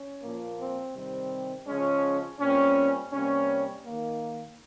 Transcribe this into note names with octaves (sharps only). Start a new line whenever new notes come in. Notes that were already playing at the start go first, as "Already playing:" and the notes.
Already playing: C#4
A#2 F3 A#3
C4
C3 D#3 G3 C4
C#3 F3 G#3 C#4
A#2 G3 C4 C#4
C3 G3 A#3 C#4
D#3 A#3